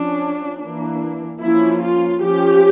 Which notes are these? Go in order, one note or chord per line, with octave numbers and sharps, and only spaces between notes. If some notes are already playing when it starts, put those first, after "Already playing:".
Already playing: F3 C#4 D4
E3 A#3 D4
F3 A#3 C#4 E4
F4
F3 C#4 G4